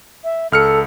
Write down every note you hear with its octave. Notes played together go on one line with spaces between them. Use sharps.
E5
C#2 A4 F6 C#7